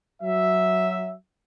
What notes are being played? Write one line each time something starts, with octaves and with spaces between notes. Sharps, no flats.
F#3 E5